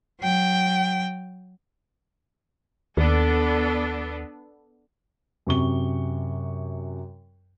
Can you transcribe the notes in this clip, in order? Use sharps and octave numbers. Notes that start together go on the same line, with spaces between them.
F#3 G5
D#2 B3 D4 A4
F#2 C3 C#6 G7